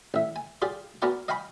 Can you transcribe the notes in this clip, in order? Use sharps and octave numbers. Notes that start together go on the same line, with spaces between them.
A1 E5
G#5
F4 G4 G#4 D5
B3 F#4 A#4 D5 F#5 G#5
D#5 F5 G5 G#5 B5 C#6